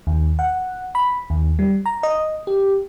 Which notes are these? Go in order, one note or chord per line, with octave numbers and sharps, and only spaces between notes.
D#2
F#5
B5
D#2
G3
A#5
D#5
G4